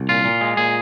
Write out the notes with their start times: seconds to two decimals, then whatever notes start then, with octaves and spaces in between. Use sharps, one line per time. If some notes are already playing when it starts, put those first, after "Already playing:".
Already playing: C2
0.09 A#2 F4
0.25 A#2
0.41 G#3
0.57 A#2 G#4